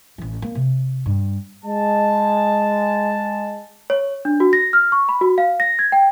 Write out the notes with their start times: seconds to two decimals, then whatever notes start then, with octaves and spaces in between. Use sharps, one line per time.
0.18 A1 E3
0.42 A#3
0.55 C3
1.06 G2
1.65 G#3 A5
3.90 C#5
4.25 D4
4.40 F#4
4.53 A#6
4.73 F6
4.92 C#6
5.09 B5
5.21 F#4
5.38 F5
5.60 A#6
5.79 G#6
5.92 G5